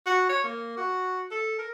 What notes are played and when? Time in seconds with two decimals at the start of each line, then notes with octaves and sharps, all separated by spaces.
0.06 F#4
0.29 C#5
0.44 A#3
0.77 F#4
1.31 A4
1.59 A#4